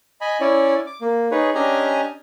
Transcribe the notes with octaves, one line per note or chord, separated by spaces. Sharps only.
D#5 G#5 B5
C#4 E4 C#5 D5
D6
A#3
D#4 G#4 B4 C#5
C#4 D4 G4 D#5 G#5 A#5